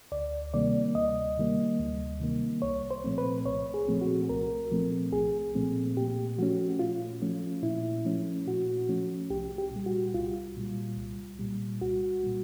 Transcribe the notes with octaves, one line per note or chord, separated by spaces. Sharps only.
D2 D5
C3 D#3 G3 A#3 D5
D2 D#5
C3 D#3 G3 A#3
D2
C3 D#3 G3 A#3
C2 C#5
C5
A#2 F3 A3 C4
B4
C2 C#5
G#4
A#2 F3 A3 C4
F#4
C2 A#4
A#2 F3 A3 C4
C2 G#4
A#2 F3 A3 C4
A#2 G4
F3 A3 C#4 F#4
A#2 F4
F3 A3 C#4
A#2 E4
F3 A3 C#4
A#2 F#4
F3 A3 C#4
C2 G4
G4
A#2 G3
F#4
C2 F4
A#2 G3
C2
A#2 G3
C2 F#4
A#2 G3